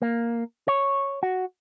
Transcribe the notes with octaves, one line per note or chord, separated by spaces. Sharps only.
A#3
C#5
F#4